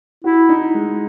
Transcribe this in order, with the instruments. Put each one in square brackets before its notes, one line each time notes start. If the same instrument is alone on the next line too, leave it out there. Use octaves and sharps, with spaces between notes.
[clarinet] E4 [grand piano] F#4
[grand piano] D#4
G#3